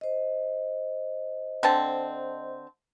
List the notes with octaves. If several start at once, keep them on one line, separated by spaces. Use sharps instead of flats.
C5 D#5
D3 C4 A5